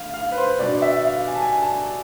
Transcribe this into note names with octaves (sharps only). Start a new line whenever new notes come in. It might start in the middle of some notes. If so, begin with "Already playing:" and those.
Already playing: D3 A3 F5
F5
B4
C5
B2 B3 D4 D5
E5
F5
G#5
A5
G#5
A5